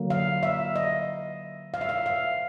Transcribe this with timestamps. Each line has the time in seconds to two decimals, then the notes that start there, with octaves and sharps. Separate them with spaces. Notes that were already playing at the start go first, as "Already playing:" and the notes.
Already playing: D3 F#3 A#3
0.10 F5
0.43 E5
0.76 D#5
1.74 F5
1.81 E5
1.89 F5
2.06 F5